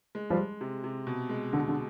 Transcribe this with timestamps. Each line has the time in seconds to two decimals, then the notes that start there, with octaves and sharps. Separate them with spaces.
0.15 G#3
0.30 F3 G3
0.38 G#3
0.61 C3
0.84 C3
1.07 B2
1.29 G#3
1.53 B2 D3
1.68 D3